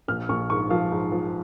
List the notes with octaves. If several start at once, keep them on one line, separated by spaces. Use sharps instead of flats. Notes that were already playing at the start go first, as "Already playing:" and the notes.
A#1 F6
A#1 C#6
G#2 C#6
F3 F5
G#2
F3